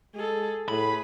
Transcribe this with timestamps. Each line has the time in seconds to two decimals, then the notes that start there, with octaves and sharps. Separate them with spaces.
0.14 G#3 G#4 A4
0.68 A2 G#4 B4 B5